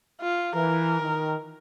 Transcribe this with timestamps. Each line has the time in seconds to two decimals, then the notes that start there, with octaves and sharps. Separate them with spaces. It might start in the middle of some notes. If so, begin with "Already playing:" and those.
0.21 F4
0.55 E3 A#4
1.01 D#3